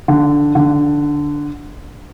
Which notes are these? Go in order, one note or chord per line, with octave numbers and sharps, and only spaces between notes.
D3
D3